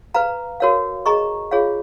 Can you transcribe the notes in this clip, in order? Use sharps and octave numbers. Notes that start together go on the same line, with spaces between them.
B4 F5 A#5
F#4 A#4 C#5 F5
G#4 D#5 A#5 C#6
F4 G#4 C#5 F5